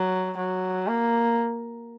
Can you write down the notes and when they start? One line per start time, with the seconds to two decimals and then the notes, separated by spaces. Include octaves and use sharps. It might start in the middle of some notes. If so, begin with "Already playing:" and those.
Already playing: F#3
0.38 F#3
0.88 A#3